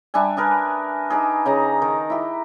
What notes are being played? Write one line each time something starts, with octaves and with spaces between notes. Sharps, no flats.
G3 D4 E5 G#5
D4 G#4 A#4 B4
D#4 G4 G#4
C#3 D#4 A#5
D#3
E4 G4